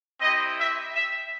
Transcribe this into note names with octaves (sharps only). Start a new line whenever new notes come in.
C4 E4 G4 D#5
E5
E5